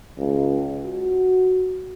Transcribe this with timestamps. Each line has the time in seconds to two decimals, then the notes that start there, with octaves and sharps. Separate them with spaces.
0.18 C#2
0.86 F#4